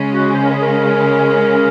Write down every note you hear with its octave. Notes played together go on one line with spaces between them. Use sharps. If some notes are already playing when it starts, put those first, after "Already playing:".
Already playing: C#3 G#3 C#4
F#4
C5
A#4
G#4
A#4